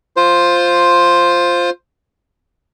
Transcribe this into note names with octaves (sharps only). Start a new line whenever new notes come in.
F4 C5